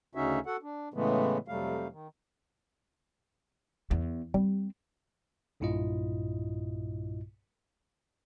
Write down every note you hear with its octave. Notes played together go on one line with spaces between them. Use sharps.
D2 C#3 C#4 D#4 F#4 E5
F#4 A4 F#5
D4
A2 C#3 E3 G#3 A3 B3
F2 C3 F#3 G3 A3 F5
D#3
E2
G3 C4
B1 G2 A#2 E4 F4 D#5